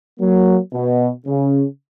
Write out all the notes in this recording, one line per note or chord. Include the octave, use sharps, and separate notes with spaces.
F#3 A#3
B2
C#3